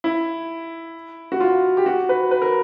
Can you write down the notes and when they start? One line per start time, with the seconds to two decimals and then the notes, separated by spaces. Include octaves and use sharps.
0.04 E4
1.32 F#4
1.40 F4
1.77 G4
1.86 F#4
2.09 B4
2.31 B4
2.42 A#4